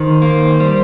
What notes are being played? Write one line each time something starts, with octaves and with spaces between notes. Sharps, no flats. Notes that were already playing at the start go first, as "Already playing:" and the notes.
Already playing: D#3 C5
A#3
G3